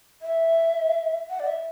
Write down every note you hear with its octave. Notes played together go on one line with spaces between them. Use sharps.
E5
F#5
D5
E5